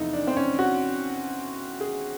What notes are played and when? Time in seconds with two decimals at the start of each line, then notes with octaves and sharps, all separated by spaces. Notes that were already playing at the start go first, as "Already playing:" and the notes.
Already playing: E2 C3 F3 A3 D#4 E4
0.13 D4
0.27 C4
0.37 C#4
0.59 F#4
1.80 G#4